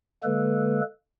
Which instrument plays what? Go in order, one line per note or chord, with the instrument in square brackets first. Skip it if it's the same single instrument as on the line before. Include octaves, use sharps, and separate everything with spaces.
[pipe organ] D3 G#3 A#3 A4 B4